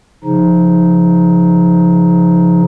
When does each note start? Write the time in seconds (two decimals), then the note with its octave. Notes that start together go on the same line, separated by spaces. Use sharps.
0.25 C#3 F3 D#4